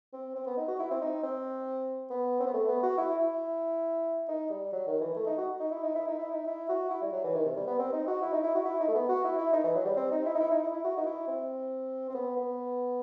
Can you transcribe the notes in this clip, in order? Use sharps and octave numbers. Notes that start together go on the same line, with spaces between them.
C4
C4
B3
D#4
F#4
E4
C4
D#4
C4
B3
C4
B3
A3
B3
F#4
E4
E4
D#4
G3
F#3
D#3
E3
A3
D#4
F#4
D#4
E4
D#4
E4
D#4
E4
D#4
E4
F#4
E4
G3
F#3
E3
D#3
C3
G3
B3
C4
D#4
F#4
E4
D#4
E4
F#4
E4
D#4
A3
B3
F#4
E4
E4
D#4
E3
F#3
G3
C4
D#4
E4
D#4
E4
D#4
E4
E4
F#4
D#4
E4
C4
C4
B3
B3